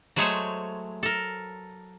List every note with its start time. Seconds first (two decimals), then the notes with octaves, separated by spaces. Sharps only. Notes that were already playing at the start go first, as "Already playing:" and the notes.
0.16 F#3 G#3 A3 G#4 C5 C#5
1.03 A4 A#4